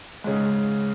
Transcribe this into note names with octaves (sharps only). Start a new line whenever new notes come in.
G#2 C#3